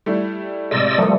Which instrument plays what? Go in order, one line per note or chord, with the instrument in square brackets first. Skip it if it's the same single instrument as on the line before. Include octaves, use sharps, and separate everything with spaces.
[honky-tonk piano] G3 A3 E4
[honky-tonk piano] A1 C3 G#3 [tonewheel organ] D5 D#5 E6
[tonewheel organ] F3 G3 A3 [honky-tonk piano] A4 A#4 D#6